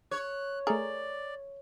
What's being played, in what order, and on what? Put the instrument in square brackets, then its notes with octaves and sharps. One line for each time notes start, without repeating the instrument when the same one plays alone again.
[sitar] C#5 [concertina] F#6
[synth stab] A3 A#4 [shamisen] G#4 [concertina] D5